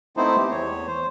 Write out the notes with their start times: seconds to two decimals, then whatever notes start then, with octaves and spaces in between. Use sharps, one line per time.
0.17 A3 B3 C4 D#4 E4 C5
0.37 G4
0.51 E2 C#5
0.87 C5